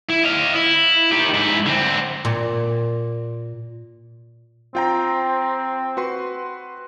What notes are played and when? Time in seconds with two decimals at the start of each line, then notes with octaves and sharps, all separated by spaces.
0.09 E4
0.24 D#5 F5
0.55 E4
1.11 D#3 G4
1.34 G#2 E4
1.66 D3 C4
2.25 A#2
4.75 C4 F4 G5 A#5
5.97 F#4 B4 C6